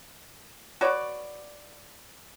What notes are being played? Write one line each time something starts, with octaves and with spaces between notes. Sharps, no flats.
F#4 B4 C#5 D5